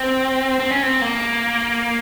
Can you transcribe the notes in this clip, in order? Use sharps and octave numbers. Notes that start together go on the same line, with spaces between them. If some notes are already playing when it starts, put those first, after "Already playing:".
Already playing: C4
C4
C#4
C4
A#3